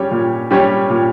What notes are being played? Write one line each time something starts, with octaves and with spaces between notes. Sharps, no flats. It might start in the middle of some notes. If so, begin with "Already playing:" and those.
Already playing: G3 C#4 G4 C#5
A#2
G3 C#4 G4 C#5
A#2